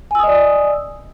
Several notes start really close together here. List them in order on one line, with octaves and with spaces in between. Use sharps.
G#5 E6 D#6 D#5 D5